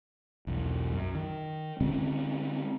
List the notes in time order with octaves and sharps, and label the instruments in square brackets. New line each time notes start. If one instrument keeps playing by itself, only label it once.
[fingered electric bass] B1 E2
F#2
D#3
D3 G#3 C4 C#4